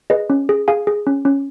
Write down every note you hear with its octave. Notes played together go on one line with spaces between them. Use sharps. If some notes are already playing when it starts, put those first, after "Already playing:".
G#4 B4 D#5
C#4
G#4
G#4 F5 G#5
G#4
C#4
C#4